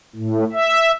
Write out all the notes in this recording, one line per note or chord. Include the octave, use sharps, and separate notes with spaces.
A2
E5